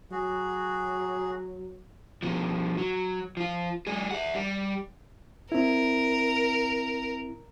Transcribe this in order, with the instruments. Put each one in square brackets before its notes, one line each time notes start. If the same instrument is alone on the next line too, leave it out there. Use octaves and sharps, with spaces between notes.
[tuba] F#3 [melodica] F#4 G#4
[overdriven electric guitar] B2 F3
F#3
F3 F4
G3 G#4
E5 F#5
G3
[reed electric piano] C4 E4 [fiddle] A#4